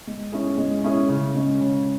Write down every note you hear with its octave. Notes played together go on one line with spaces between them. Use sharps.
G#3
C#4 E4 G#4
G#3
C#4 E4 G#4
C#3
G#3 C#4
C#3